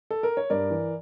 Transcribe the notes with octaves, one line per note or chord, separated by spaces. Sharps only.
A4
A#4
C#5
G2 A#4 D5
E3